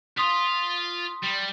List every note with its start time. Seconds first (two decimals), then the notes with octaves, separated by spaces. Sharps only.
0.17 F4 F5 C6 D#6 B6
1.23 G3